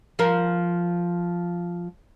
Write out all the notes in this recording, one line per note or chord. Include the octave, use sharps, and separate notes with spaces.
F3 A#4